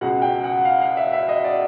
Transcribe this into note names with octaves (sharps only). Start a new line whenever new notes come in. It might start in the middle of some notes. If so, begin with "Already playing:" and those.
C#2 B2 G#3 F#5
G5
F#5
F5
F5
E5
E5
D#5
D5